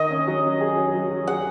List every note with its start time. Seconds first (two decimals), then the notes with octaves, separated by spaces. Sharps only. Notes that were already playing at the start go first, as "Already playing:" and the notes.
Already playing: D#3 D#5
0.11 C#4
0.27 F#3
0.44 C#4
0.61 G#4
0.77 F#3
0.94 F#3
1.11 F#3
1.27 G#4 F#5